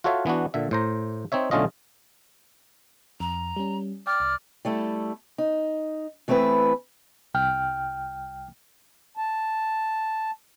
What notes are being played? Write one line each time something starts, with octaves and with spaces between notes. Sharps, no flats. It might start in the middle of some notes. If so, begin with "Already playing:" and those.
F4 F#4 A4 C#5 E5 F5
E3 B3 D4 F#4
A#2 D3 E5
A2 C5 A#5
C4 D#4 C#5 E5
B1 D3 A3 C#4 F4 D#5
F2 A#5
G3 C#4
D5 G5 F6
C2
G3 A3 E4 A4
D#4
E3 A3 C4 E4 B4
C2 G5 F6
A5